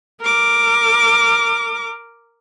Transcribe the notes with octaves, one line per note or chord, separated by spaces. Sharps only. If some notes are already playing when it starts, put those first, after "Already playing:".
A#4 D6